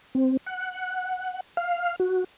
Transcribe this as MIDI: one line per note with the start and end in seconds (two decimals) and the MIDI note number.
0.15 0.37 60
0.46 1.40 78
1.57 1.96 77
2.00 2.24 66